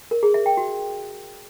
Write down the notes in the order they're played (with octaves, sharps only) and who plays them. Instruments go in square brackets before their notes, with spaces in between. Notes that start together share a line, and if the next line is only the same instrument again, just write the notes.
[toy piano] A#4
G#4
E5
G5
F#4